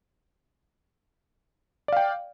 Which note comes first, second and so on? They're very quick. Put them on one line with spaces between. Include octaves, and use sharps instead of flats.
D5 F5 G5